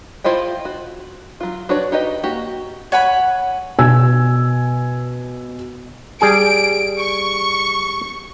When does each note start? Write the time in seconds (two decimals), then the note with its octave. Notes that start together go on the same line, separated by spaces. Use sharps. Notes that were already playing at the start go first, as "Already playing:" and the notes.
0.24 E4 F4 C5 D#5 G5
0.65 F#4
1.40 F#3 F4
1.69 D4 F#4 B4 C#5 D5
1.92 D#4 G4 B4 D#5
2.23 A#3 F#4 G4
2.92 C#5 F#5 G#5 B5
3.79 B2 G#5 E6 G#6
6.21 G3 G#4 G#5 D7
6.99 C#6